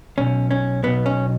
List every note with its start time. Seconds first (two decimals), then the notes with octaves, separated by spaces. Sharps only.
0.18 B1 B2 C#4
0.51 C#4
0.83 B1 B2 B3
1.06 C#4